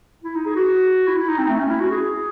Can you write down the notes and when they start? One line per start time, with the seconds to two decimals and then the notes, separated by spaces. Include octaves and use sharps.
0.24 E4
0.35 D#4
0.46 G#4
0.55 F#4
1.07 E4
1.18 E4
1.29 D#4
1.38 C4
1.49 A3
1.60 C#4
1.70 E4
1.80 F#4
1.91 G#4